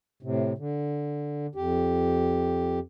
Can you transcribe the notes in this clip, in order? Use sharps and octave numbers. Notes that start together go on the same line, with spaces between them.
A2 C3
D3
F2 G4